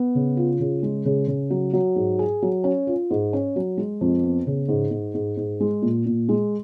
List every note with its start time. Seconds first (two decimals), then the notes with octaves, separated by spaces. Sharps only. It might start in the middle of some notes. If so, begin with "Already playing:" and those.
Already playing: B3
0.15 C#3
0.37 F4
0.60 C#3
0.83 G#3
1.06 C#3
1.28 C#3
1.50 F#3
1.73 F#3
1.96 G#2
2.19 G#4
2.42 F#3
2.64 C#4
2.87 F4
3.11 G#2
3.33 C#4
3.56 F#3
3.78 G#3
4.01 F2
4.23 B3
4.47 C#3
4.68 G#2
4.91 G#2
5.14 G#2
5.37 G#2
5.60 G#3
5.82 A#2
6.06 A#2
6.29 G#3